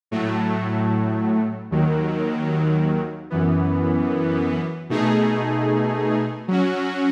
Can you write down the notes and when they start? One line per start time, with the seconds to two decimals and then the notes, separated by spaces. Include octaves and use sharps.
0.11 A2 F#3 A3
1.71 D#2 D#3 F#3
3.30 F#2 E3 B3
4.90 B2 A3 D#4 G#4
6.48 F#3 C#4 F#4